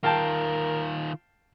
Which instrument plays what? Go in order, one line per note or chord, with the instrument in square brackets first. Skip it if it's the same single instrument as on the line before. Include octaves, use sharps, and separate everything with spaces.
[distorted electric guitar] D#3 F4 [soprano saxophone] A#4 [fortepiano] F5 G5 A5